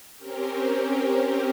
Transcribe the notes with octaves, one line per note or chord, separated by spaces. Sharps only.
C4 C#4 G4 A#4